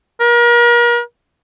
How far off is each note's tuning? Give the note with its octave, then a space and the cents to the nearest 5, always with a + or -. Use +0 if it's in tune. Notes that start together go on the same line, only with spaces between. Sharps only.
A#4 +35